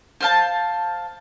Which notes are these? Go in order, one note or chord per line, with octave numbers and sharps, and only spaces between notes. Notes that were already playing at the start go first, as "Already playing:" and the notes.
C5 F5 A5